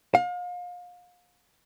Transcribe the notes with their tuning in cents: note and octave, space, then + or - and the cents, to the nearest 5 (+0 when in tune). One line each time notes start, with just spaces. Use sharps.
F5 +35